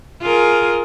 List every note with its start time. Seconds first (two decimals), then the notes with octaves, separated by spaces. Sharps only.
0.21 F4 G#4 A#4